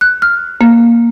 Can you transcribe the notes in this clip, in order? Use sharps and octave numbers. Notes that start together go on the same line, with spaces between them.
F#6
F6
A#3